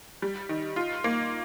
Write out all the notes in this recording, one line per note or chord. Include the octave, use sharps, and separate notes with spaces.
G3
D#3
F4
A#3